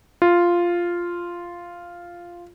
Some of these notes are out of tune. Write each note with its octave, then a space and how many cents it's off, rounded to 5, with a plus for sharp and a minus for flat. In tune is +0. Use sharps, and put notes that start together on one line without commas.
F4 -5